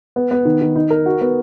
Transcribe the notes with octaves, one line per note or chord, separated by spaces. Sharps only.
B3
B3
D#3
D#3
D#4
A#4
F#4
B3